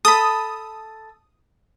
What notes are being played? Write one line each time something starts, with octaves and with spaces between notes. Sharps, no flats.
A4 B5 D#6